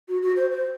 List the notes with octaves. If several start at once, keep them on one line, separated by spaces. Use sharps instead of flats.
F#4
F#4
C5
C5